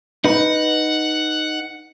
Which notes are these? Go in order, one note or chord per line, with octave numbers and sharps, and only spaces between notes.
D#4 B4 F#5